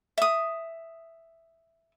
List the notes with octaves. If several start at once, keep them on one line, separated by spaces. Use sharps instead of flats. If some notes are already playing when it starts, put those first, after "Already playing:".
E5 D#6